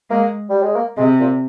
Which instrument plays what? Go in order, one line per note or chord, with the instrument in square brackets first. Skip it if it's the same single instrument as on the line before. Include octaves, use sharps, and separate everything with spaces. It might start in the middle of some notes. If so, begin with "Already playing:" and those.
[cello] G#3 [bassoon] A#3
[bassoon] G3
G#3
A#3
[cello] C3 [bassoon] G#3
[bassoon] A#2